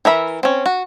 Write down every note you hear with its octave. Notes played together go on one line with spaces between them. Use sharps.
E3 A#4 E5 B5
C4 C#4
F#4